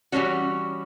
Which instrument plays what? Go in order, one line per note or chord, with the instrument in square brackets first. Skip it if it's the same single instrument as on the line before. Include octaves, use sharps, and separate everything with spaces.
[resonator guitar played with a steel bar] E3 G3 A#3 C#4 F#4